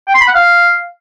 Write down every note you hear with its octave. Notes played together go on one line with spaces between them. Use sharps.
G5
C6
B5
F#5
F5